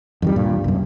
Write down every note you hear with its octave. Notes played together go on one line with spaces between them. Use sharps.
F2 D#3 G3
D#1 G2 A#2
C2 F#2